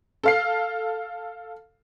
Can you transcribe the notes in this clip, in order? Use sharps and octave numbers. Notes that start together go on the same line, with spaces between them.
A4 F5 C7